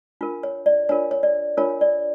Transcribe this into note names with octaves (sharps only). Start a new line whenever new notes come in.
D4 F4 A#4
C#5
D5
D4 F4 A#4 C#5
C#5
D5
D4 F4 A#4 C#5
D5